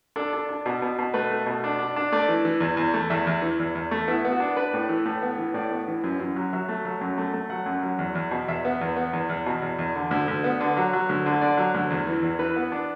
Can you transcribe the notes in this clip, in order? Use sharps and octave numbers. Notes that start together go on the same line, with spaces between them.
D4 A4
D4
D4
B2
B2
B2
A3 B4
A3
B2
D4
D4
D4
A3 D5
E3
E3
E2
E2
A3
E2 E5
E2
E3
E2
E2
A3
B3 E4
B3
F#4
D4
D4 B4
A2
E3
A2
B3
E3
A2 D5
B3
E3
F#2
F#2
F#3
F#3 E5
A3
F#3
F#2
A3
A3
F#3 F#5
F#2
F#3
E2
E2
B2
E2 E5
B3
E2
B3
E2
E2
B2
E2
E2
D3
D2
D2
B3
D3
F#3
F#3
D2
D3
D3 D5
F#3
D2
E2
E3
E2
E3 B4
B3
D4